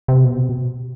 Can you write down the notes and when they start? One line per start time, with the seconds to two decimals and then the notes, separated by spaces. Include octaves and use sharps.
0.08 C3
0.24 B2